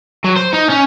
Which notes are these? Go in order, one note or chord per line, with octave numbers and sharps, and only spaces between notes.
F#3
C5
D#4
C#4